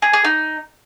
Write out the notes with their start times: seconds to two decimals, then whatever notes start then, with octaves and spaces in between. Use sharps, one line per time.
0.02 G#4
0.13 G#4
0.24 D#4